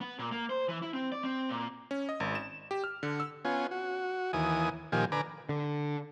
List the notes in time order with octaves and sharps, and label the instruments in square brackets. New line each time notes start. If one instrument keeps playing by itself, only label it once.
[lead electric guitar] B3
A#2
A#3
C5
E3
E4
C4
D5
C4
A#2
[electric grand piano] C#4
D#5
G#1
E7
G4
F6
D3
E6
[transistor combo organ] B3 C#4 F4 G#5
F#4
D#2 E3 G#5 D#6
A#2 D#3 F3 G4 G#5
D3 B4 G#5 A#5 D6
[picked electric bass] D3